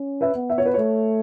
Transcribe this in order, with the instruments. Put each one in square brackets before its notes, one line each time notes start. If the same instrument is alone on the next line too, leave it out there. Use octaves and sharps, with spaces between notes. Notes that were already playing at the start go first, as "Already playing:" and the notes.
Already playing: [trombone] C#4
[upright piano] B4 E5
[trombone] B3
[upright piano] E5
C#5
B4
[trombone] A3 [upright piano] C#5